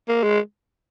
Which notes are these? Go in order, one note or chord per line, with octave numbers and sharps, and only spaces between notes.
A#3
G#3